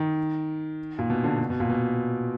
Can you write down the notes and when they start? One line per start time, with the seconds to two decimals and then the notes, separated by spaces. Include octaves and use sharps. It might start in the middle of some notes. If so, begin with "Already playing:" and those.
Already playing: D#3
0.99 A#2
1.10 B2
1.24 D3
1.39 B2
1.50 B2
1.60 A#2
1.69 B2